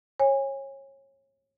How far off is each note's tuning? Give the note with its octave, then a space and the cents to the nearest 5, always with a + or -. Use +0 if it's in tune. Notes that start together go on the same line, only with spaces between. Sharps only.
C#5 -25 G#5 -25